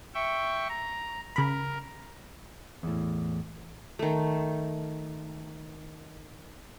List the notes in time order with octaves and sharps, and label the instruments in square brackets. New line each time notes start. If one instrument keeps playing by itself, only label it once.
[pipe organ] E5 G5 C#6
A#5
[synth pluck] C#3 B5 [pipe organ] A#4
[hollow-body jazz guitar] E2 A2
[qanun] D#3 A3